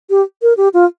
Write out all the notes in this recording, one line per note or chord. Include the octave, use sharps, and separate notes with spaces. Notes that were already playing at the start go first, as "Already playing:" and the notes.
G4
A#4
G4
F4